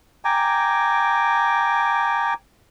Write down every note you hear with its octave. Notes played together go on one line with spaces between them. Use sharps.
G5 G#5 A#5 D6